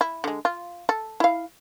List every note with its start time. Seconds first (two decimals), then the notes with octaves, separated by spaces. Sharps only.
0.01 E4
0.24 D3 G#3
0.45 F4
0.89 A4
1.20 E4 F5